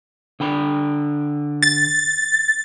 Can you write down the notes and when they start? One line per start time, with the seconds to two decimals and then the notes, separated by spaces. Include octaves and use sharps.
0.40 D3 G5 B5
1.63 A6